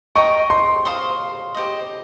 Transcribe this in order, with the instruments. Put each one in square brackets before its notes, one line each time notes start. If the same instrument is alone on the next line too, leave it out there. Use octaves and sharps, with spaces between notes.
[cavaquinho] A#4 D#5 G5 A#5 [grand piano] C#6
[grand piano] C6
[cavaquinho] C5 F5 C6 D#6
G4 C5 D#5